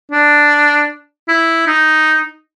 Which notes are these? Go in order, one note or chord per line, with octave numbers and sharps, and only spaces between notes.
D4
E4
D#4